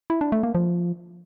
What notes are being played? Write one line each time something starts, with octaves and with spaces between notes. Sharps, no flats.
E4
D4
A3
A#3
F3